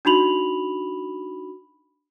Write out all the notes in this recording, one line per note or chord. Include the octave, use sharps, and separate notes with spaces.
D4 D#4 F#4 B5 F7 F#7